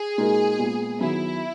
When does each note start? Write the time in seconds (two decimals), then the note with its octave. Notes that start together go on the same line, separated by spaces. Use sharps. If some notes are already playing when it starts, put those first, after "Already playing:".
Already playing: G#4
0.18 A#2 G#3 D#4 F#4 A#4
0.59 A#2 G#3 B3
1.00 D#3 F#3 B3 E4